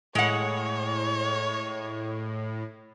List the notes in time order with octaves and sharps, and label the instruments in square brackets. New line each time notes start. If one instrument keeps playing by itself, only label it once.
[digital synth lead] A2 [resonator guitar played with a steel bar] G#3 F#5 [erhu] C#5